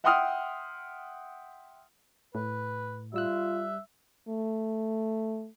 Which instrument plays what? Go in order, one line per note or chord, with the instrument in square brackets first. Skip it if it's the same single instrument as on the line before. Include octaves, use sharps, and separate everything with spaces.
[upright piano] E5 F#5 G5 C6 D#6 F6
[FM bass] A2 [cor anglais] B4
[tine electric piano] G3 E6 F#6 [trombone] F4 [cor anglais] E5
[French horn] A3